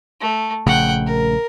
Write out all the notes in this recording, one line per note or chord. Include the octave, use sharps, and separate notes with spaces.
A3
A#1 C#3 A3 F#5 G5
A#4